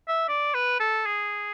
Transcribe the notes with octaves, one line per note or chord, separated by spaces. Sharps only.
E5
D5
B4
A4
G#4